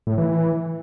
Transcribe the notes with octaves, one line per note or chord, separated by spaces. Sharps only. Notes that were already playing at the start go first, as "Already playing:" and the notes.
A2
E3
E3